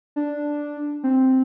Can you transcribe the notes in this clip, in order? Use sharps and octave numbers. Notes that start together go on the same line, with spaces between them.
D4
C4